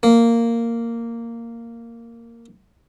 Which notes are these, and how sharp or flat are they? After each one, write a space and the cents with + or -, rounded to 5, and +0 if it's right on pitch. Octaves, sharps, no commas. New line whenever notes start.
A#3 -10